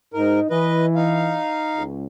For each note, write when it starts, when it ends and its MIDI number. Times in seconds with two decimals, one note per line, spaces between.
0.14 0.40 44
0.14 0.50 63
0.14 0.40 70
0.50 1.37 52
0.50 0.86 71
0.50 0.86 75
0.95 1.83 63
0.95 1.83 77
1.77 2.06 37